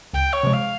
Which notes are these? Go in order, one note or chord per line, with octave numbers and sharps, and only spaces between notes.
C#2 G5
C#5
C3 F3 G#3
F5